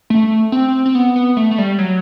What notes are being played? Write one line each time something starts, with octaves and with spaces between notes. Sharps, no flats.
A3
C4
C4
B3
B3
A3
A3
G3
F#3